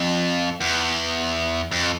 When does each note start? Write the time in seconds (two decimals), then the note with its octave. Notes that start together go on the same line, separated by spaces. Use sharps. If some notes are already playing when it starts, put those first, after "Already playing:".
Already playing: F2
0.60 E2
1.71 F2